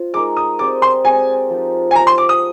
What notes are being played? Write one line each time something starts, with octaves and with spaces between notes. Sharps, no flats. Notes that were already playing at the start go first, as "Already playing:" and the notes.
Already playing: F4 C5 D#5
G#3 D#4 A#4 D6
D#6
G#3 C4 G4 D5 D6
C6
G#3 C4 G4 D5 G#5
F3 G#3 D#4 G4
G#5
F3 G#3 D#4 G4 A#5
C6
D6
D#6